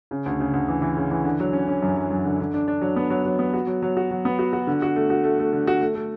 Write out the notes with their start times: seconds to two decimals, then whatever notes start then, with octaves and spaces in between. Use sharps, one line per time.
0.11 C#3
0.26 D2
0.40 C#3
0.53 D2
0.68 E3
0.82 E3
0.97 C#3
1.11 E3
1.25 D3
1.40 F#3
1.53 C#4
1.68 C#4
1.82 F#2
1.96 F#3
2.10 F#2
2.25 D3
2.40 D3
2.54 D4
2.68 D4
2.81 F#3
2.96 B3
3.10 F#3
3.25 F#3
3.39 B3
3.54 F#4
3.67 F#3
3.82 F#3
3.97 F#4
4.11 F#3
4.25 B3
4.39 F#4
4.53 F#4
4.67 D3
4.82 F#4
4.96 A3
5.10 F#4
5.24 A3
5.39 A3
5.53 D3
5.67 F#4
5.81 A3
5.95 A3